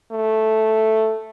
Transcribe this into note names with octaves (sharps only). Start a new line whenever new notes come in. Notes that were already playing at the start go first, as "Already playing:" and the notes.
A3